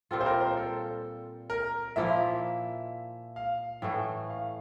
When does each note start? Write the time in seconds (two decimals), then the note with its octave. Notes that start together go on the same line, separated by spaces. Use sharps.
0.11 A#2 G3 C4 F4 A4
0.20 C5
0.26 A#4
0.41 C5
0.57 A4
1.50 A#4
1.96 A#2 F3 A#3 E4 E5
3.36 F5
3.82 A2 E3 A3
4.30 F5